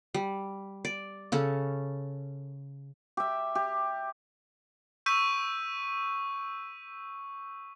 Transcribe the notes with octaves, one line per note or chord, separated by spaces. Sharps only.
G3
D5
C#3 C#4 A4
G4 E5
G4
C#6 E6 G6 B6 D#7